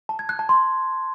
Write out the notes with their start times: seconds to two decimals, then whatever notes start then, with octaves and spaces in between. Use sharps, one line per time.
0.09 A5
0.19 G#6
0.29 F#6
0.39 A5
0.49 C6